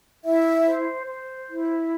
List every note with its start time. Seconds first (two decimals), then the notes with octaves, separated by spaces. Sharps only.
0.24 E4 E5
0.65 C5
1.07 C5
1.48 E4